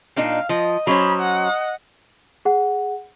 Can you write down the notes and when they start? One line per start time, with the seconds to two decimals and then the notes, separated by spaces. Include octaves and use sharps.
0.16 A#2 D4 D#4 F5
0.49 F3 D#5
0.87 F#3 C#4 C5 B5
1.20 F#5
2.45 G#4 F#5